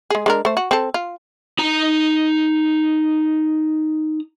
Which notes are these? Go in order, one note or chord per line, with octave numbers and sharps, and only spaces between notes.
G#3 G#4
G#3 D4 A#4
A3 C5
F#4
C4 A4
F4
D#4 A#5